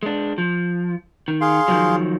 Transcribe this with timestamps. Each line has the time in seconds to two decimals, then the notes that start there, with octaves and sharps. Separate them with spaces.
0.03 G#3 D4
0.38 F3
1.28 D#3
1.41 G#4 F5 C6
1.68 D#3 F3 F#3